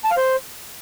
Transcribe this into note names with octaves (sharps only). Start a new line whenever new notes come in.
A5
F5
C5